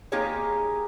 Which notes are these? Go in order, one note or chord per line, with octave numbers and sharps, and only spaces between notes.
A#3 D#4 F4 G4 G#4 C#5